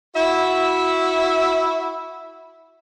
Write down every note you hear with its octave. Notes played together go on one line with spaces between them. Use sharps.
E4 F#4 E5